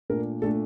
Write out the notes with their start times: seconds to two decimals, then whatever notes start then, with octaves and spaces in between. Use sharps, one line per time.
0.10 A#2 A3 D4 A#4
0.42 A#2 A3 D4 A4